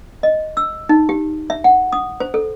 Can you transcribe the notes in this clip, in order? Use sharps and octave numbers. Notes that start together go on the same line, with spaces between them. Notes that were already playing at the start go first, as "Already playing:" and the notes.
D#5
E6
D#4
G4
E5
F#5
D#6
C5
A4